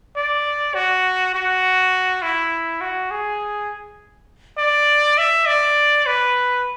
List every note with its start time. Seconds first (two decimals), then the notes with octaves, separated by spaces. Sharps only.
0.16 D5
0.75 F#4
1.34 F#4
2.22 E4
2.81 F#4
3.11 G#4
4.58 D5
5.18 E5
5.46 D5
6.06 B4